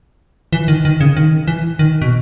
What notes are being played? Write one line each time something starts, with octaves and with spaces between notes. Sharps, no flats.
E3
D#3
D#3
C#3
D#3
E3
D#3
B2